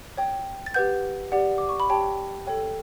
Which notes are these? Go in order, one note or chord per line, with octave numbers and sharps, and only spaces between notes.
C#5 G5
A6
G4 B4 F#5 G6
G4 D5 F#5
D6
C#6
B5
G4 C#5 G5 A5
A4 C#5 G5